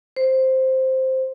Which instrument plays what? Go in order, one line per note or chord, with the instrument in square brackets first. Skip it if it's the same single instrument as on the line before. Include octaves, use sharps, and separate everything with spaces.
[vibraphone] C5